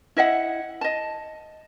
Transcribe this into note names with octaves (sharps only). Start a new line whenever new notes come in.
E4 D#5 E5 F#5
D#5 A5